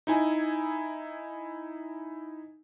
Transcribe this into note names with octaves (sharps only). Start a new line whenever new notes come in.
D#4 E4 G#5